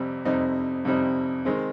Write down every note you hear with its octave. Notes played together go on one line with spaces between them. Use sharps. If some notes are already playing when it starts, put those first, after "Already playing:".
Already playing: F2 C3 G3 C4
F2 C3 G3 C4 D#4
F2 C3 G3 C4 D#4
D#3 G#3 C4